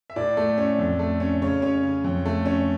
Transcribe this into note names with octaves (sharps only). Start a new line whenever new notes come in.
E5
A2 D5
A3
C#4
F2
A3
C#4
C#3 C#5
C#4
C#3
F2
A3
C#4